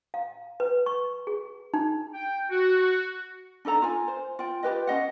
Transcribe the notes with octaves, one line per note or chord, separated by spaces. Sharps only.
F5
B4
C#6
G#4
D#4
G5
F#4
D4 D#4 A4 A#5
F4 G#5
C5
F4 G5
F4 G4 B4 D#5
C#4 D#4 D#5 F#5